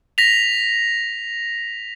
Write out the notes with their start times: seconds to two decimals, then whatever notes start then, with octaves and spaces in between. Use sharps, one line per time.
0.18 A#6 B6 F7